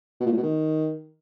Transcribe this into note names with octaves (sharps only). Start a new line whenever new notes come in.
B2
A#2
A2
B2
D#3